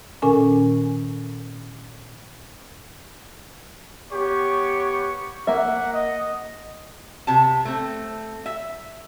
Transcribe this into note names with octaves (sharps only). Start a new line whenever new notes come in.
A#2 D#3 C#4 A4 A#4 G#5
B3 G4 C#5 C#6
A#3 E5 F#5
D#5
C3 A5
A3 C4
E5